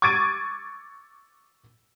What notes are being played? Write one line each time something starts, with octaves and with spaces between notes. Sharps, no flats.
C#6 D6 G#6 A6 D7 D#7